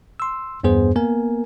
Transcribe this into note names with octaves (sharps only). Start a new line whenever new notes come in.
C6 E6
E2 G2 B3 G#4 C5
A#3 B3 A#4 G#5